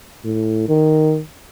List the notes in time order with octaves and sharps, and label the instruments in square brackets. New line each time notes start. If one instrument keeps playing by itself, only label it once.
[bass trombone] A2
D#3